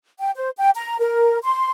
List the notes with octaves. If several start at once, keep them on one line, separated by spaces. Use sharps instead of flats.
G5
C5
G5
A#5
A#4
C6